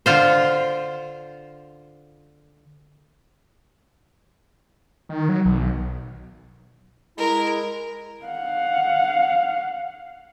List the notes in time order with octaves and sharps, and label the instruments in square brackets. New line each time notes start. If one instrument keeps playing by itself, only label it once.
[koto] D3 F4 C5
[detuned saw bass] D#3
F#3
B1
[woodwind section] G#3 E4 [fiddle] A#4
[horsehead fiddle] F5 F#5